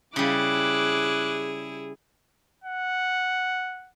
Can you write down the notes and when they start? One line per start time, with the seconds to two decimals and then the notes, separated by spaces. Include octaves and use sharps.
0.16 C#3 G3 E4 G#4 D6 F#6
2.64 F#5